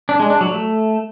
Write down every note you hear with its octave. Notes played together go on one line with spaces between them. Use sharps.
D4
G#3
D4
F#3
A3